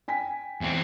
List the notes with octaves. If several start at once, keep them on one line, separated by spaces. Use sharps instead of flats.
G5 G#5 B6
E2 C4